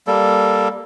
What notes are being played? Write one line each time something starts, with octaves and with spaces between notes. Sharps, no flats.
G3 A#3 A4